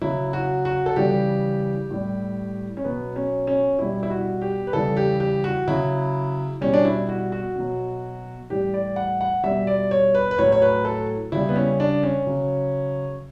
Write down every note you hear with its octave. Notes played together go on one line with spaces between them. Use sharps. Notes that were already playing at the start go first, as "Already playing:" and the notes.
C#3 F#3 E4
F#4
F#4
A4
C#3 E3 G3 G4
A2 G3
C#4
B2 F#3 B3
C#4
C#4
B2 G3 E4
E4
F#4
G4
B4
C#3 E3 G3 A4
G4
G4
F#4
C#3 F#3 E4
B2 G3 C#4
D4
E4
F#4
F#4
B2 F#3
A2 E3 G3 G4
D5
F#5
F#5
B2 G3 E5
D5
C#5
B4
B4
A2 F#3 C#5
C#5
B4
A4
C#3 G3 E4
B3
C#4
D4
C#4
C#3 F#3